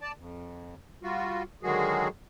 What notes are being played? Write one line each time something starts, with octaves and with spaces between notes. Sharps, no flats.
D5 A5
F2
G3 F4 F#4
D3 D#3 F#3 G#3 F#4 G#4